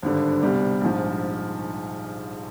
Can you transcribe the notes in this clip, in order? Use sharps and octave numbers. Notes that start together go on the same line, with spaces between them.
G#1 G2 D3
C2 B2 G3
A#1 G#2 F3